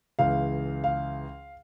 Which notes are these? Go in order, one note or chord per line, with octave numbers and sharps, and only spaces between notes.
C#2 C#3 E3 F5
F5